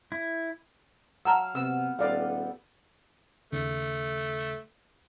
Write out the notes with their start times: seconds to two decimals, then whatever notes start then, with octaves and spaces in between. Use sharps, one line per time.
0.12 E4
1.25 F#3 F5 F#5 A5 A#5 E6
1.55 C3 B3 E6
1.99 D#1 B3 G4 A4 D5 F5
3.52 D#2 C#3 A3